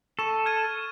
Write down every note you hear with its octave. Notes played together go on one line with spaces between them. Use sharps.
A4 C#6 E7
F6 G#6 D#7